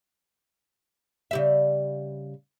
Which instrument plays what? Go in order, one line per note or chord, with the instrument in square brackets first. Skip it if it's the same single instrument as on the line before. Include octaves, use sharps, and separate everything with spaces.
[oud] C#3 G3 E5